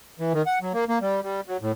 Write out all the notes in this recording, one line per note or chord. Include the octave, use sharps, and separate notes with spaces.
E3
D#3
F#5
F#3
A#3
A#3
G3
G3
F#3
A2